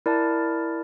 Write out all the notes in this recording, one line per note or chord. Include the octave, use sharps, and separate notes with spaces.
E4 A#4 D5 A5